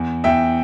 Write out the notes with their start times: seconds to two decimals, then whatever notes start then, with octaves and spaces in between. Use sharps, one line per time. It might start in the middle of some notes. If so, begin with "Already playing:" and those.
Already playing: E2
0.24 E2 E5 G5